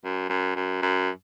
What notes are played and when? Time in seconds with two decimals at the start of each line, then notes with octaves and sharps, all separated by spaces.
0.04 F#2
0.30 F#2
0.56 F#2
0.82 F#2